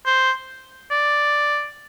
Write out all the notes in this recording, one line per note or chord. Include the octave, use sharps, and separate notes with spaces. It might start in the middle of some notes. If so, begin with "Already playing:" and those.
C5
D5